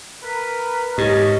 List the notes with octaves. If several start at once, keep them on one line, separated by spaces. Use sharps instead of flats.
A#4 B4
G#2 C#4 G4 D#5